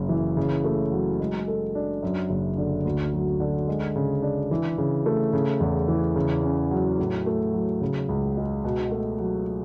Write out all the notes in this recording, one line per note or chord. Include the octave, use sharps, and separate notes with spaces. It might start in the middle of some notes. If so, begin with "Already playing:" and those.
Already playing: F#1 F#2
E3
C#3
A3
F#3
G#3
A4
D4
F#2
F#1
D3
D2
F#3
D3
G#3
C#3
D4
E3
C#3
A3
C#3
E2
E3
C#3
C#4
F#3
A2
A3
F#3
C#3
C#2
G#3
B2
A3
F#3